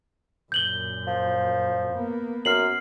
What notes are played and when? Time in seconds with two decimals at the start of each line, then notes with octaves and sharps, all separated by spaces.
0.52 F#2 A#2 G6 F#7 G7
1.07 F3
1.92 A#3 B3
2.45 F#2 F6 C7 F#7